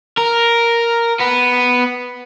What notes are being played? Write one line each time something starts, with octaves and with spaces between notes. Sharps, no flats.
A#4
B3